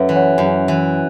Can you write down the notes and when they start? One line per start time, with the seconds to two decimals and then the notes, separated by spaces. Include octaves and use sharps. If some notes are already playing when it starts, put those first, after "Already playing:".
Already playing: F#2 A3 B4 C#5 E5 F#5
0.09 E3
0.16 C#5 F#5
0.38 F#2
0.68 E3